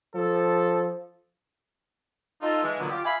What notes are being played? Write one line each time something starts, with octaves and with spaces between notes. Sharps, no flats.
F3 A4
D#4 F4 A4
E3 G#3
A#2 D3 F#3 A#3 B3
F4 G4 D6
E5 F5 G#5 B5